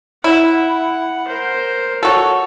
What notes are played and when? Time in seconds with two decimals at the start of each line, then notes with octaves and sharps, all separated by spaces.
0.24 E4 F#5
1.27 A#4 C5
2.03 F#4 A4 C#5